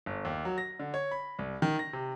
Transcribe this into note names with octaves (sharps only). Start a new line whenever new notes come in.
G1
D#2
F#3
A#6
D3
C#5
B5
C2
D#3
A#6
C3